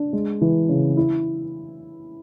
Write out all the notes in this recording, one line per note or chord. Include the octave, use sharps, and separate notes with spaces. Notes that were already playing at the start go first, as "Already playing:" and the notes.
Already playing: D4
G#3
E3
C#3
E4